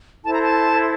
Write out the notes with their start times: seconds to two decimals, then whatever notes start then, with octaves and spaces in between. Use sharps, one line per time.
0.23 E4 A4 C5 A5
0.33 A#5
0.42 A5